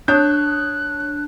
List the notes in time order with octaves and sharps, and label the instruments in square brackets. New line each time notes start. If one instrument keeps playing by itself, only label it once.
[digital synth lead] D4 [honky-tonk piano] C#5 [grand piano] D#6 G6 [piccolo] F#6